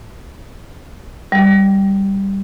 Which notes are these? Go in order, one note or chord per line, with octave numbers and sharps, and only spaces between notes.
G3